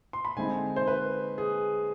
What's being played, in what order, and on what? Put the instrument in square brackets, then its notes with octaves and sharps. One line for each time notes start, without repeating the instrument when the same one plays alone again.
[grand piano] C6
B5
D3 G#3 C4 D#4 G#5
C5
B4
G#4